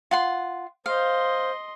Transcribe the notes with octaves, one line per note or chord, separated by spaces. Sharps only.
F4 F#5 C6
C5 D#5 F5 C6